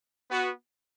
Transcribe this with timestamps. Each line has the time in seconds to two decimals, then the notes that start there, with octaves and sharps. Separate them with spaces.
0.31 B3 F#4